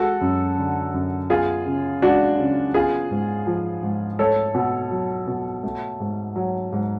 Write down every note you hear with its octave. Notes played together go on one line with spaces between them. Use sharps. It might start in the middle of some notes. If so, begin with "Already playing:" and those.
Already playing: G#3 F#4 A4
F#2
D3
F#2
B3 F4 G#4
C#3
G#3 D4 F#4
C#3
B3 F4 G#4
G#2
F3
G#2
A3 A4 C#5
B2
F#3
B2
A3
G#2
F#3
G#2